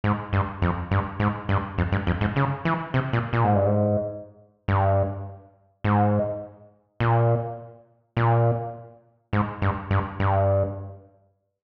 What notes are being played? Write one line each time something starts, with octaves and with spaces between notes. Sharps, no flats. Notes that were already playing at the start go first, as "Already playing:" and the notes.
G#2
G2
F2
G2
G#2
G2
F2
G2
F2
G#2
C#3
E3
C3
A#2
A#2
G#2
G2
G#2
G2
G#2
A#2
A#2
G#2
G2
G2
G2